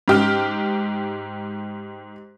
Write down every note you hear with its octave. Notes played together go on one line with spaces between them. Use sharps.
G#2 G4 F6